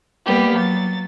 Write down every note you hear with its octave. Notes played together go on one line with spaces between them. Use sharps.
G3 A#3 B3 G4
F#3 A6